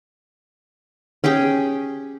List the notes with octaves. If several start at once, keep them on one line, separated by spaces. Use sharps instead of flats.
C#4 G4 G#4 G5